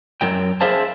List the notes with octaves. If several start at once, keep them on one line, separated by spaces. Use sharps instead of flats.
F#2 F#3 G5
G#4 C5 E5 F5 A5